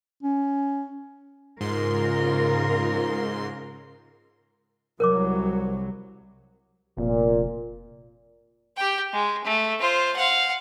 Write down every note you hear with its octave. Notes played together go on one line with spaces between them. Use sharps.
C#4
G#2 C#3 F4 A#4 C6
C2 F#3 A#4 C#5 D6
F1 A#2
G4 G5
G#3
A3
F4 C5
F5 F#5